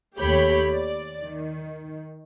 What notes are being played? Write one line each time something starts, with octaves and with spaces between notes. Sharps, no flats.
D#2 A3 G4 C#5 B5 G6
D5
D#3